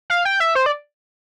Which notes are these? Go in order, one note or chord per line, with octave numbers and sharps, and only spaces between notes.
F5
G5
E5
C5
D5